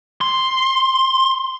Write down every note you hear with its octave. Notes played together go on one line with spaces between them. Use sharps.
C6